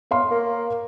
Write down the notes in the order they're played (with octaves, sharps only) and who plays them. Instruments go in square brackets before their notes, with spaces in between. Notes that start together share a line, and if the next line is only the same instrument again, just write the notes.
[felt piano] C#5 F5 C6
[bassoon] A#3